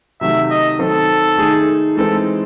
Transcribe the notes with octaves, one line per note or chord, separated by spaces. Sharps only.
C3 D#3 F#3 A3 E5
D#5
D#3 F#3 C4 F#4 A4 C5
D#3 A3 D#4 G#4
E3 G#3 C4 D#4 A4